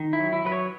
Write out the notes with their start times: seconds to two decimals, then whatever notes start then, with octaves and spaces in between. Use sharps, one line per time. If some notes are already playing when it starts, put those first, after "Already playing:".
Already playing: D#3
0.13 E4
0.19 F#3
0.33 E4
0.45 F#3 B4
0.52 C#5